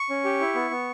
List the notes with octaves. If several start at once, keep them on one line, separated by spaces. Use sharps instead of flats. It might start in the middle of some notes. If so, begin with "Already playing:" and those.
Already playing: C#6
C#4
G4
E4
B3
B3